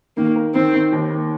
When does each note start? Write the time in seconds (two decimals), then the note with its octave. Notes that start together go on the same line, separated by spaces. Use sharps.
0.17 D#3 A#3
0.36 A#4
0.54 D#3 C4
0.74 D#3
0.92 D#2
1.10 A#3